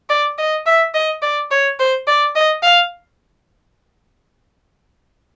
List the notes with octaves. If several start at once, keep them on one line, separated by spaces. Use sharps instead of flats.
D5
D#5
E5
D#5
D5
C#5
C5
D5
D#5
F5